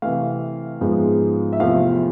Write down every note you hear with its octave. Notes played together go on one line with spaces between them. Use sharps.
C3 E3 A3 F5
G#2 F3 G#3 B3
E5
E2 C3 F3 A3 F5